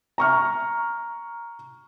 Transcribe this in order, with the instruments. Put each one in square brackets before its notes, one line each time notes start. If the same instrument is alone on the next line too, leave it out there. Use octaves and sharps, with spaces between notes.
[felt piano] A#5 C#6 F6